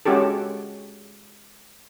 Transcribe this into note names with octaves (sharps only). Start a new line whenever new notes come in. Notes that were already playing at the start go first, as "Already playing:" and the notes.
G#3 C#4 F#4 G4 A4